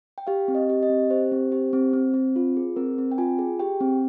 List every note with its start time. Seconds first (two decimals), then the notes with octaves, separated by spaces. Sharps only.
0.18 G5
0.27 G4 F5
0.48 C4
0.55 D#5
0.69 G4
0.83 D#5
0.90 C4
1.10 G4 C5
1.32 C4
1.52 G4
1.73 C4
1.93 C4
2.14 C4
2.36 F4
2.57 G#4
2.76 C4 A#4
2.98 C4
3.12 G5
3.18 F4 G#5
3.39 G#4
3.59 G4 G5
3.80 C4